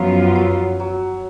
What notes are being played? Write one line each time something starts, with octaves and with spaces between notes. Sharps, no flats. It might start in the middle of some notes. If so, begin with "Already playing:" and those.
Already playing: F#2 F3 F#3 B3 F4
F#3
F#3